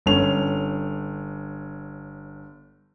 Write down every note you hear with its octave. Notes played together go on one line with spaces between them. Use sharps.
G1 C#4 F7